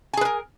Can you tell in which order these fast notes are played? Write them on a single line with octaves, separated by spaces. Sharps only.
G#5 G#4 B4 A#4